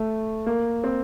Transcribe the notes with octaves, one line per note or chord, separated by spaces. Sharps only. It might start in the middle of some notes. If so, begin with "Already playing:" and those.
Already playing: A3
A#3
C4